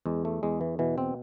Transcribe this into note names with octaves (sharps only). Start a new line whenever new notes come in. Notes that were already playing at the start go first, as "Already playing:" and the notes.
E2 G#3
A3
E2 G#3
E3
B2 E3
C4